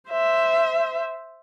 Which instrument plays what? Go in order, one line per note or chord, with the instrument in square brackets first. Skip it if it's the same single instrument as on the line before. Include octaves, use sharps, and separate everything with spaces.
[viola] C5 E5